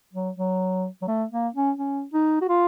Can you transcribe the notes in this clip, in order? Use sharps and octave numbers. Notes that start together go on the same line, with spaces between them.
F#3
F#3
F#3
A3
A#3
C#4
C#4
D#4
F#4
F4